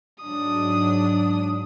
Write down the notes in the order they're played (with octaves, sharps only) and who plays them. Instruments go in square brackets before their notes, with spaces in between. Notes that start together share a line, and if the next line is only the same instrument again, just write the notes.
[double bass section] G#2 F#3 [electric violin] D4 D#6